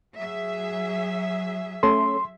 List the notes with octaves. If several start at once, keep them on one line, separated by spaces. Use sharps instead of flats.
F#3 G#4 E5
A3 C#4 A4 C6